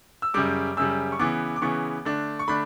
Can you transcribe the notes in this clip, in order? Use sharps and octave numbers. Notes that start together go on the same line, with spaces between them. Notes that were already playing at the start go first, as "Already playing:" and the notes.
E6
F#2 C#3 G3 D6
F#2 C#3 G3 E6
C#6
C#3 E3 B3 D6
D6
C#3 E3 B3 C#6
D3 A3 D4
C#6
D3 A3 D4 B5